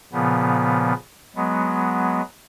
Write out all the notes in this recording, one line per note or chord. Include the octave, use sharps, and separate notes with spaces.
A#2 C#3 F3 B3
F#3 G#3 B3